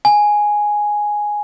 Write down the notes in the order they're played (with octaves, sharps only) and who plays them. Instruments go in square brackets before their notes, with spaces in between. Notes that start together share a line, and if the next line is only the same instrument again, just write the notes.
[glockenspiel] G#5